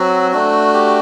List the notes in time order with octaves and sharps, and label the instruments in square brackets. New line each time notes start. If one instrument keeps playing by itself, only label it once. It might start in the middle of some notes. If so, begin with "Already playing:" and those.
Already playing: [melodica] F#3 C4 F#4
A3 D4 F#4
G4